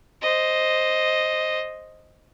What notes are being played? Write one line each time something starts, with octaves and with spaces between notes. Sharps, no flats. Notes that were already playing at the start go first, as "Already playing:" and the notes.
C5 D#5